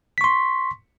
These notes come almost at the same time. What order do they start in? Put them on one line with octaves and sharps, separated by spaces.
B6 C#6 C6